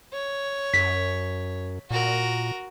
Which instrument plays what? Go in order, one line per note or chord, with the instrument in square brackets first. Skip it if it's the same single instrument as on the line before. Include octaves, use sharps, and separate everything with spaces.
[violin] C#5
[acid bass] F#2 [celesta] B6
[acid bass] A#2 [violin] F#4 A#4